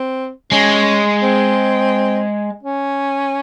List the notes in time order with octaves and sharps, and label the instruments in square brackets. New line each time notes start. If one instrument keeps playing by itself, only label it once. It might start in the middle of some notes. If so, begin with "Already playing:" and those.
Already playing: [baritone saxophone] C4
[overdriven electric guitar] G#3 [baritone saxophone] C#4
[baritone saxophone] C4
C#4